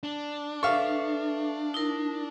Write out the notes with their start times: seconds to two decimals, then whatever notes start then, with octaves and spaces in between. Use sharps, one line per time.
0.03 D4
0.63 A4 B4 E5 F5 C#6
1.74 D#4 E4 A#4